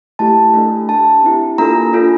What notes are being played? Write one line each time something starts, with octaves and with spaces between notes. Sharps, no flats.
A3 E4 G4 A5
A3 D4 A4
D4 G4 A5
C4 E4 G4
A#3 D4 F4 A4 A#5
D4 F4 A4